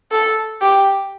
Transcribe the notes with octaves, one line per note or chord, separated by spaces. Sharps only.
A4
G4